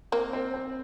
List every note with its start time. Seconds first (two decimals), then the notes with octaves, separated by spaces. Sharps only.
0.12 A#3 C4
0.33 C4
0.54 C4